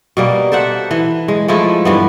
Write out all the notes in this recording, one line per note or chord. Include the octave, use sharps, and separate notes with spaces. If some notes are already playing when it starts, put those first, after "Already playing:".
B2 G3 A#3
A4 C5 E5 F#5
E3
G#3
F3 G#3 A3 E4
G2 E3 B3